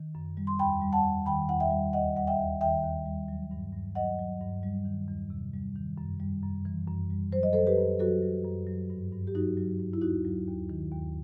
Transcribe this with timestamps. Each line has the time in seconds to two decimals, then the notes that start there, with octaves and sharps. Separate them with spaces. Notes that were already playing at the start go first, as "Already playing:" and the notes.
Already playing: D#3
0.15 F#2
0.37 G3
0.47 C6
0.59 E2 G5 B5
0.81 G3
0.93 F#5 A5
1.04 E2
1.26 D#3 G5 B5
1.49 E2 F#5
1.60 E5 G5
1.71 G3
1.93 D#2 D#5 F#5
2.16 G3 F#5
2.27 E5 G5
2.38 D#2
2.61 D#3 E5 G5
2.84 D#2
3.06 G3
3.28 F#3
3.51 G2
3.73 G2
3.95 F#3 D#5 F#5
4.19 F#3
4.41 G2
4.63 G3
4.85 D#3
5.08 E2
5.30 C3
5.54 G3
5.76 D#3
5.98 F#2
6.20 G3
6.43 F#2
6.65 E3
6.87 F#2
7.10 G3
7.32 F#3 C5
7.43 D#5
7.53 F#2 A4 C5
7.66 G4 B4
7.78 F#2
7.99 F#3 F#4 A4
8.22 F#3
8.45 F#2
8.67 F#3
8.90 G2
9.12 G2
9.27 G4
9.35 F#3 D#4 F#4
9.57 F#3
9.80 G2
9.93 E4
10.01 D#2 D#4 F#4
10.25 F#3
10.48 D#2
10.70 D#3
10.92 D#2